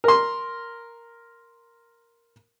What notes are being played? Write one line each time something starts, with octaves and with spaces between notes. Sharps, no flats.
A#4 C6